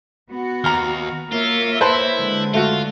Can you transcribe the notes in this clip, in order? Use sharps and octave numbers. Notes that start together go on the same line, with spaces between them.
B3 F#4
D#2 A#5 F6
A#3 F4 C#5 E5
E4 B4 C5 A5
D3 G#3
A3 F4 F#4